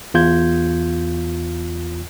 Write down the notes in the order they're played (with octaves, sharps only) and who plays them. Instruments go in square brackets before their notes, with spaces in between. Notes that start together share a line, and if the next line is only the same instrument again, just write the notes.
[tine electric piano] E2 F4 G6 G#6